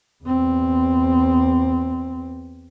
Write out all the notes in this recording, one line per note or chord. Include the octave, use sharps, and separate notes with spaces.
E2 C4